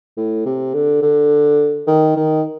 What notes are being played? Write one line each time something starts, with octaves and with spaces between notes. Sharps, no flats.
A2
C3
D3
D3
D#3
D#3